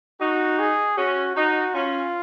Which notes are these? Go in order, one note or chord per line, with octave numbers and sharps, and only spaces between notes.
D#4 F#4
G#4
C#4 F#4
D#4 F#4
C#4 F4